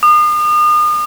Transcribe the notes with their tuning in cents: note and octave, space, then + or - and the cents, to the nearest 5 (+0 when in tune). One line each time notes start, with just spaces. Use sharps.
D#6 -40